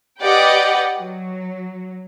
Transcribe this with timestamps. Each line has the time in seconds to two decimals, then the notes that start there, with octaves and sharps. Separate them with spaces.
0.22 G4 B4 D5 D#5 F#5 G5
0.99 F#3